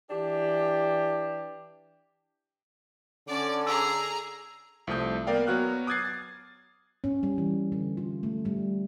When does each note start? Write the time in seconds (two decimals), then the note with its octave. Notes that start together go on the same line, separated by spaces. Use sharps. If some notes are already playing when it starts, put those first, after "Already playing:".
0.10 E3 D4 G4
3.28 D3 C#4 D5 F#5 A5 D6
3.67 G#4 A#5 E6
4.87 C2 F3 A3 D#6 G6
5.27 A#3 B3 A#4 D5 F5 G5
5.47 F#3 B3 F#4 F6 F#6
5.87 D6 D#6 F#6 G#6 A6 C7
6.05 A6
7.04 C#4
7.23 G3
7.38 E3
7.72 D3
7.97 F4
8.23 A3
8.45 G3